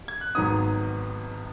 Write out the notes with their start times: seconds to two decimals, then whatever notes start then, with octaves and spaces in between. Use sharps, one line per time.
0.08 G#6
0.21 F#6
0.35 G#1 G#2 D#3 F#3 B3 D#6